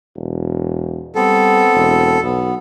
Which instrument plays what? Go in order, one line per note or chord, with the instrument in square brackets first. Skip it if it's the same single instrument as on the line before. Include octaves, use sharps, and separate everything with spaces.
[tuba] E1
[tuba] G3 [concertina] B3 C4 [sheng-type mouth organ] A4
[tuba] E1
[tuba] B1 [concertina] B3